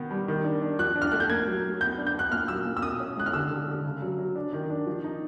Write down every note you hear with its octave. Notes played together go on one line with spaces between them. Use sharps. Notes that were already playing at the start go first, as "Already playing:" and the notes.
Already playing: B2 D#3 B3
G3
D#3
D4
D4
F3 F#6
D4
F6
A3 F#6
G6
A#3 G#6
F#3
F#3
B3 G6
D4
G6
B3 F#6
A#2 F6
F#3 E6
A#2
E6
B2 D#6
C#4
G#3 F#6
F6
D3 E6
D3
D3
C#3
F#3
F#3
D4
D#3
D4
F3
D#4